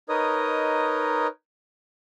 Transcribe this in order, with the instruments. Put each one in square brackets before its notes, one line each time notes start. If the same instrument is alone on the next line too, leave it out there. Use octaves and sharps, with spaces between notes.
[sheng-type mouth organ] D#4 A#4 B4 C#5 D#5 D#6